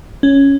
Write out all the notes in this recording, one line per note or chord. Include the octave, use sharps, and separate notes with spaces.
C#4